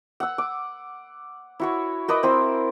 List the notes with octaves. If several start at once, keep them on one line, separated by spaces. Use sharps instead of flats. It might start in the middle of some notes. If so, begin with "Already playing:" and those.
F#5 E6
D6
E4 F#4 C#5
A#4 B4 D5 D#5
C4 E4 C5